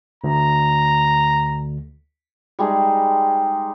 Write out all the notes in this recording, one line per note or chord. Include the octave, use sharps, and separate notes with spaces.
D2 A#5
G3 G#3 D#4 G#4